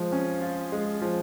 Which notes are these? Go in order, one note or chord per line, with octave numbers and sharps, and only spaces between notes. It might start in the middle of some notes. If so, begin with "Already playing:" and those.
Already playing: F3 G#3
C#4
F4
G#3
F3